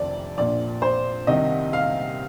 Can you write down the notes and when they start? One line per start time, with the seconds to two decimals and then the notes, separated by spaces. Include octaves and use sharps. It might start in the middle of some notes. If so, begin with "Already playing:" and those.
Already playing: F1 F2 C3 D#3 D5
0.37 A#1 A#2 D5
0.82 C5
1.27 C2 C3 D#3 D#5
1.73 F5